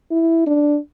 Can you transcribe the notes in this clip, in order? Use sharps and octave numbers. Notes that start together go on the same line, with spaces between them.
E4
D4